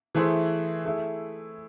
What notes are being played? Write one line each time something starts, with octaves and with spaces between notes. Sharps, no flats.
E3 A3 E4 G#4 C5
A3 E4 G#4